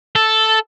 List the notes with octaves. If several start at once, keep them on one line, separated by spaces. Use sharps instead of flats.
A4